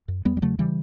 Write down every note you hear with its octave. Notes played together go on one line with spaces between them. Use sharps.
F#2
E2 G3 B3
G3
C#3 F#3 A3
C#3 E3 G3